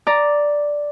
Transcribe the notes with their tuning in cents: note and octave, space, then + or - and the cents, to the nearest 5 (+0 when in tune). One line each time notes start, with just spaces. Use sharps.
D5 +0 A#5 +5